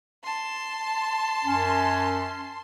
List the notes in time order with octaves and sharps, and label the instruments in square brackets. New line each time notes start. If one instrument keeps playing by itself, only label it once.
[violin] A5 C6
[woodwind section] F#2 C#4